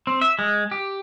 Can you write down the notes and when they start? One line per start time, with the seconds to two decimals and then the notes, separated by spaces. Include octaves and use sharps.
0.07 C4
0.21 E5
0.39 G#3
0.71 G4